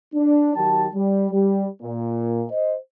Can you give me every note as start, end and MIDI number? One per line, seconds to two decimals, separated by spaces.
0.14 0.54 62
0.54 0.87 51
0.54 0.87 54
0.54 0.87 67
0.54 0.87 79
0.54 0.87 81
0.93 1.28 55
1.31 1.66 55
1.82 2.44 46
2.50 2.75 72
2.50 2.75 75